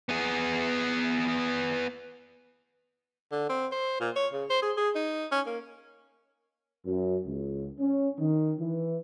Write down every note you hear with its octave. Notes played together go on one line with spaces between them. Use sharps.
B3 G#4
D3
C4
C5
A#2
C#5
C#3
C5
G#4
G#4
D#4
C#4
A#3
F#2
C#2
C#4
D#3
E3